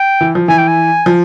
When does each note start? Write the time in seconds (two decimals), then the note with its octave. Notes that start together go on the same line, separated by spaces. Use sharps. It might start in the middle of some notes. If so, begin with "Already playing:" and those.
Already playing: G5
0.21 E3
0.35 F3
0.48 E3 G#5
0.58 G5
0.68 G#5
1.06 F3